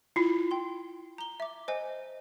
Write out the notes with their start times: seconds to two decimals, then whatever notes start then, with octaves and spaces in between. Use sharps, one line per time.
0.16 E4 F4
0.51 G5 C6
1.18 A#5 G7
1.40 E5 D6
1.68 C5 D#5 G#5